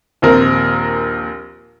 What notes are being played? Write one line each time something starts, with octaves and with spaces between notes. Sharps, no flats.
A#1 D#2 C4 A#4